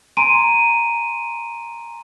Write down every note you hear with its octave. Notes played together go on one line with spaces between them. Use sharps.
G#5 A#5 C6 D7 D#7